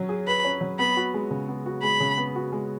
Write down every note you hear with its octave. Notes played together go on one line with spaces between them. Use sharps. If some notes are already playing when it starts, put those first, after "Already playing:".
Already playing: F#3 C#4
G#4
B4 B5
C#4
F#3
B3 B5
F#4
G#3
C#3
B3
F#4
G#3 B5
C#3
B3
F#4
G#3